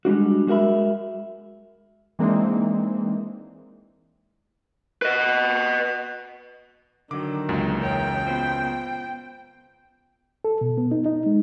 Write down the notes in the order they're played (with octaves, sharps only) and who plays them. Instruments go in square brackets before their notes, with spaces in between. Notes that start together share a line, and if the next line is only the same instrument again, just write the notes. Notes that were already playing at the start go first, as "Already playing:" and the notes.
[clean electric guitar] G3 G#3 D4 F#4
G#3 F#4 A#4 E5 B5
[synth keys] E3 G#3 A#3 C4 D4 D#4
[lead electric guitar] B4 D#5
[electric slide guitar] D3 F#3 [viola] D#3 [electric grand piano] D6
[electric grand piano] C#2 F#2 A#2
[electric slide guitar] E2 A#4 C#5 [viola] G5
[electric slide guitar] B3 F4 C5
[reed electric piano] A4
B2
B3
D#4
D#4
G#3